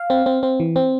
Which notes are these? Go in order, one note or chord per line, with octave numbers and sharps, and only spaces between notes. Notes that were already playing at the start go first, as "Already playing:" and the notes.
Already playing: F5
C4
C4
C4
E3
C4